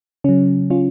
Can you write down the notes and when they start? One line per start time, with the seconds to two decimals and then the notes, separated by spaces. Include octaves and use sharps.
0.24 C#3 F#3 C#4
0.70 C#4 F4